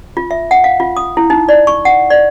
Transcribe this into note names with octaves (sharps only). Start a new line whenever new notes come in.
F4
E5
F#5
F5
F4
D#6
E4
D#4
D5
C#6
F#5
D5